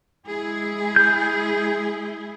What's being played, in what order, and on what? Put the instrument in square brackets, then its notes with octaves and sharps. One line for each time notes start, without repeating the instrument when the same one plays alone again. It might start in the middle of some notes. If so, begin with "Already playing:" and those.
[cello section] G#3 E4 G#4
[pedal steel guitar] G6